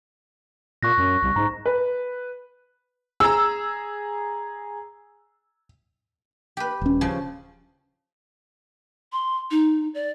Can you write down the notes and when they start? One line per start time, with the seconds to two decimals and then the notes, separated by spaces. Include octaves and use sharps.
0.83 A#2 C#6 F#6 A#6
0.98 F#2
1.23 C2
1.36 G#2 A#5
1.66 B4
3.20 G#4 A#5 E6
6.57 G4 B4
6.81 D#1 C#4
7.01 C#3 F3
9.12 C6
9.51 D#4
9.94 D5